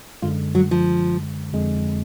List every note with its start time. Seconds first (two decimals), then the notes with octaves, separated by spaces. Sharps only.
0.22 F#2 D3 G#3 F4
0.55 F#3
0.71 F3
1.53 F2 D3 G#3